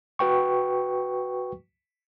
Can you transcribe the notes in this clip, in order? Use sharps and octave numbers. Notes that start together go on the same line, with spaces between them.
F#4 B4 G5 C#6